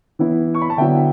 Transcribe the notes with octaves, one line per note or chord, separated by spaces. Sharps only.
E3 B3 E4
C#6
B5
A5
D3 F#3 B3 E4 E5 G5